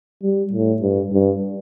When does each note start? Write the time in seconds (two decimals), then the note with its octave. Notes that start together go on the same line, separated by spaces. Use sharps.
0.23 G3
0.53 A2
0.82 G2
1.12 G2